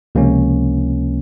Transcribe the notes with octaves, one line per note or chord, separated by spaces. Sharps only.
C#2 C3 F3 A#3 C#4